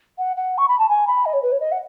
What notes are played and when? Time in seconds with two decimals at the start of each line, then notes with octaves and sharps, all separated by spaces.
0.18 F#5
0.37 F#5
0.58 C#6
0.68 B5
0.79 A5
0.89 G#5
1.07 B5
1.26 D#5
1.34 C#5
1.43 B4
1.52 C#5
1.60 D#5
1.72 F#5